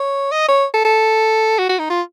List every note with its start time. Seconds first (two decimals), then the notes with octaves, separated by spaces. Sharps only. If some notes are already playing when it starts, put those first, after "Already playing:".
Already playing: C#5
0.32 D#5
0.48 C#5
0.74 A4
0.85 A4
1.59 F#4
1.69 F#4
1.79 D#4
1.90 F4